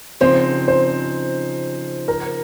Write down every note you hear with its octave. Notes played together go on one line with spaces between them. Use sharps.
C#3 F3 C4 D#4 C5
C5
A#4